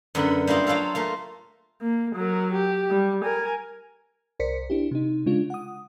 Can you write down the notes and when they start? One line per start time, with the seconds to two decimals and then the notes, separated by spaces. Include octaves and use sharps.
0.15 F#2 D3 B3 B4 F#5
0.47 G3 A#3 E4 F4 G#4
0.67 F#3 F4 F#4 A4 F5
0.95 A3 A#3 F4
1.81 A#3
2.15 F#3 A#4
2.53 G4
2.90 G3
3.25 A#4 G#5
4.39 C2 A#4 C5 D5 B6 C#7
4.70 D4 E4 G4
4.91 C3 D#4
5.26 C#3 G#3 D4 F4
5.50 F#5 D#6